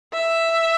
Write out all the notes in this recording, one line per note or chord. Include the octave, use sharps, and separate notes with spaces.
E5